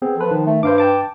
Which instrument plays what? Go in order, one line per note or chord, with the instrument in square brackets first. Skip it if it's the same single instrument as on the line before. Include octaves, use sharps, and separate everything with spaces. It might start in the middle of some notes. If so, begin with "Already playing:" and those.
[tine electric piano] B3 C4 G#4
[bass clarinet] F3 [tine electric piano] A4 B4
[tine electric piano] D#3
[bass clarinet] A3
[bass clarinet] G2 [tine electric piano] C5 F5 D6
[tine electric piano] G5 A5 D6